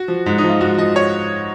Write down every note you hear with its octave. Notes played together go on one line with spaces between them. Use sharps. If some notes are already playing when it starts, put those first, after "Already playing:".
Already playing: F#4
F3
G#2
D#4
F3
F4
G#2 F#4
F3 D#5
C#5